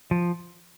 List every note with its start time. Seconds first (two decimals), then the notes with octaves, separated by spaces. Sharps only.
0.11 F3